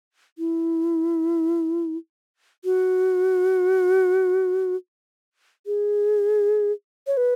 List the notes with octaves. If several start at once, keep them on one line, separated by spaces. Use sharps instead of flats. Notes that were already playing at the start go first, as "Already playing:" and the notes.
E4
F#4
G#4
C#5
B4